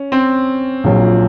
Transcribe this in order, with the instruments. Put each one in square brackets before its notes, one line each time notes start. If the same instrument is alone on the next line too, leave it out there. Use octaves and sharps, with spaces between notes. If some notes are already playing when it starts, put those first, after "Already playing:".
Already playing: [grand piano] C#4
C4
[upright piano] A#1 A#2 F#3